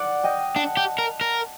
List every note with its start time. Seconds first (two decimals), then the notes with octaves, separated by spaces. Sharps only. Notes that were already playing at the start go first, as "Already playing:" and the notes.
Already playing: D5 F#5
0.24 D#5 G5
0.56 D4 F#5 A5
0.77 G4
0.98 A#4
1.21 A#4